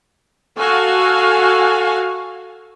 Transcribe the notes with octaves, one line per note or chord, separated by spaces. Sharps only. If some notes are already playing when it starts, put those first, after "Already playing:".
F#4 A4 F5 G#5